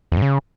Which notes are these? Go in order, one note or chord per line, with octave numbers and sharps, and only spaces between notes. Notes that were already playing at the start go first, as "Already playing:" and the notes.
E2
G2
C#3